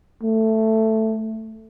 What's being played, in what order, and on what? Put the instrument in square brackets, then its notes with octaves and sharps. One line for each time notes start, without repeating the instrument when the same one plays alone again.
[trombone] A3